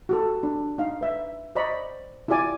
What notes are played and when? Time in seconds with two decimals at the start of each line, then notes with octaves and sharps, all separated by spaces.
0.09 F#4 G4 A4
0.43 D4
0.78 D#4 F5
1.01 B4 E5
1.55 C5 D5 D#5 A#5 B5 C#6
2.28 E4 F4 G4 D5 G#5 D6